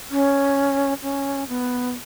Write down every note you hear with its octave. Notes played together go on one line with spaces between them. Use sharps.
C#4
C#4
B3